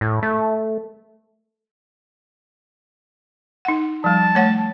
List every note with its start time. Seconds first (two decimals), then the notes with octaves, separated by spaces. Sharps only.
0.01 A2
0.23 A3
3.65 D#4 F#5
4.04 F3 G3 A5
4.35 A3 C#5 F#5